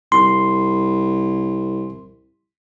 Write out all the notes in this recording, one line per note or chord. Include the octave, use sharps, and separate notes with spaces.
C2 C6